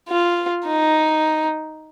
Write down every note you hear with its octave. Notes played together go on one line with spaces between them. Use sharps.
F4
D#4